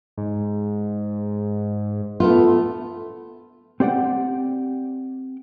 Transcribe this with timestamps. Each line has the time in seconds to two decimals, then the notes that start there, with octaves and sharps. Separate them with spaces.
0.17 G#2
2.20 A3 B3 F4
3.80 C4 G4 D5 F#5 G5